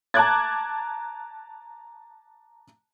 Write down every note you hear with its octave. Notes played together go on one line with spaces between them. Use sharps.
A5 A#5 D6 F#6 G#6 A6